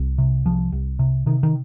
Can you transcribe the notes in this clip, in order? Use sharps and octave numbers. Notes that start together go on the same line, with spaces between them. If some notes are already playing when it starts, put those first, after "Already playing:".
Already playing: C2
C3
C2 F3
C2
C3
C3 D#3
D#3